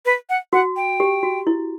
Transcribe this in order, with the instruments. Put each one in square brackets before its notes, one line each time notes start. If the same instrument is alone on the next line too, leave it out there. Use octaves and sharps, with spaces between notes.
[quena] B4
F#5
[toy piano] F#4 [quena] F#5
[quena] G5
[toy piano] G4
F#4
E4